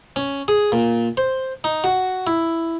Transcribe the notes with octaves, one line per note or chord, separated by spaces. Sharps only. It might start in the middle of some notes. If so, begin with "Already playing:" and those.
C#4
G#4
A#2
C5
D#4
F#4
E4